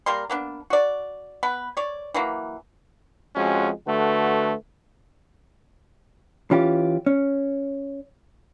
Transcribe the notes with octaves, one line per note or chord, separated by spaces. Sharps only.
G3 A#3 A#4 C6
A#3 B3 D4
F#4 D5
B3 B4
C#5 D5
E3 F#3 A#3
F2 G#3 C#4 F#4
D3 A3 F#4 B4
E3 C#4 F4 G4
C#4